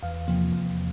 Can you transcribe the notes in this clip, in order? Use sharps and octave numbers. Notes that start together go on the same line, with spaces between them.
E2 F5
C3 F3 A#3
E2